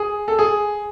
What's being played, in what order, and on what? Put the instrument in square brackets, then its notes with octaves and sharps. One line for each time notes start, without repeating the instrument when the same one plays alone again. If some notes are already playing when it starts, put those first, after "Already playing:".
Already playing: [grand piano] G#4
A4
G#4